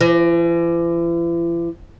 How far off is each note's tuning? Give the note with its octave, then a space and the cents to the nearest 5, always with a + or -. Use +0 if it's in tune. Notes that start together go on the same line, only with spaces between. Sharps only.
E3 +45